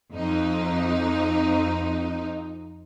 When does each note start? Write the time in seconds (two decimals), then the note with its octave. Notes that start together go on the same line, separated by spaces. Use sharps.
0.14 F2 D#4